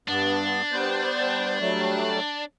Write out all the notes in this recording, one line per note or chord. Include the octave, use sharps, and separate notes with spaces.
G2 B3 D4
G3 B3 C5
F#3 G3 A3